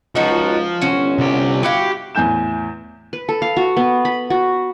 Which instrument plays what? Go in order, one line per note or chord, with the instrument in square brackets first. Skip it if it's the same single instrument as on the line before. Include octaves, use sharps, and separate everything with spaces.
[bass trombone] C#2 [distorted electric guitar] F3 [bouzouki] D#4 F#4
[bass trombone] G1 [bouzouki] C#4 F#4 C5
[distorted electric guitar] C2 G4
[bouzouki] E4 F#4 F5 [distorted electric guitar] G4
[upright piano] E2 A2 G#5 G6 E7
[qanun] B4
A4
F5
F#4
B3
B5
F#4